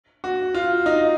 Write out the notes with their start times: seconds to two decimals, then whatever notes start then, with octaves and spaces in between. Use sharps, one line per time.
0.24 F#4
0.54 F4
0.86 D#4